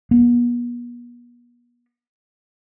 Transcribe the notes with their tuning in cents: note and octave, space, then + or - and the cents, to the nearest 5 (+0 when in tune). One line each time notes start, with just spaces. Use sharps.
B3 -40